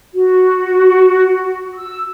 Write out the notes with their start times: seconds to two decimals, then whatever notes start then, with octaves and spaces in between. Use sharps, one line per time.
0.13 F#4
1.75 E6